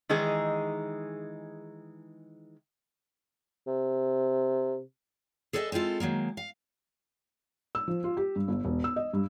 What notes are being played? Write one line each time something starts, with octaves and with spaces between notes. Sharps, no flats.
D#3 E3 G#3 D#4 G#4
C3
G#4 A4 B4 C5 D#5 E5
G#3 C4 E4 F4 A4
D#3 F#3 G#3 A#3
F5
E6
F3
F4
G4
G2
G1
E1
E6
D#5
G2